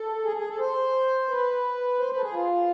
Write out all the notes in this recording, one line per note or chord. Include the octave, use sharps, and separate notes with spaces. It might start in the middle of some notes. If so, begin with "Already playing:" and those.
Already playing: A4
G#4
G#4
A4
C5
B4
C5
B4
A4
G#4
F4